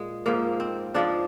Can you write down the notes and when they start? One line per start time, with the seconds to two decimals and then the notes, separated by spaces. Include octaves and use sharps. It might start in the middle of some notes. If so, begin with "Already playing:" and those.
Already playing: A#2 G#3
0.26 G#2 F3 G#3 A#3
0.60 C4
0.94 G#2 F3 G#3 D4